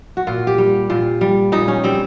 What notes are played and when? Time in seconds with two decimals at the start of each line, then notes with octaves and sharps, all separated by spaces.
0.17 F#4
0.27 A#2 F4
0.47 G4
0.58 G3
0.90 A#2 F4
1.21 G3
1.52 A#2 D#4
1.68 C#4
1.84 G3 C4